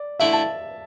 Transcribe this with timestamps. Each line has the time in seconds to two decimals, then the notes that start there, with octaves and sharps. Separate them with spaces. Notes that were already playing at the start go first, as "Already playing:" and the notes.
Already playing: D5
0.20 D3 A3 E4 E5
0.33 A5